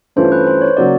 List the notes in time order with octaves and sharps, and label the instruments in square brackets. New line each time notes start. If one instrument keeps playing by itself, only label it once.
[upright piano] G2 E3 A3 C#4 F4 [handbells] C5
[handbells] B4
C5
C#5
[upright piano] C#3 F#3 A#3 [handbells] D5